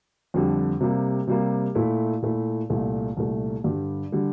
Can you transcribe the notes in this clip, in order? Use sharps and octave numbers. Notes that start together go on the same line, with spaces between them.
F2 D3 G3
C3 G3 A#3
C3 G3 A#3
A#2 A3 E4
A#2 A3 E4
C2 A#2 A3
C2 A#2 A3
G2 D3 G3
D3 G3